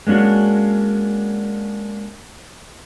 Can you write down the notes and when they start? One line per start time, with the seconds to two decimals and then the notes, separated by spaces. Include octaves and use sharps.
0.07 G#3 A#3 C#4 D4 F#4